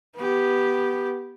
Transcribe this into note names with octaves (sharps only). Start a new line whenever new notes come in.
B3 G4